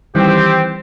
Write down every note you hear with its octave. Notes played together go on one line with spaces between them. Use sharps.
D#3 E3 G3 C4 G4 F#6